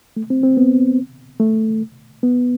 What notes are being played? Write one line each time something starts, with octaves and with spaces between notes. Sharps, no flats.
A3
C4
C4
B3
A3
B3